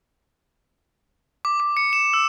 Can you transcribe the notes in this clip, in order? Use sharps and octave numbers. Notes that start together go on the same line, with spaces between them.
D6
D6
C#7
E7
E6